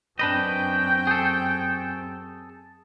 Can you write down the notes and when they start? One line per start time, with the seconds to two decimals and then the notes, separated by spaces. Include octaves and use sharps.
0.19 F#2 C4 D4 B4 D#5 G5
1.07 G#4 A4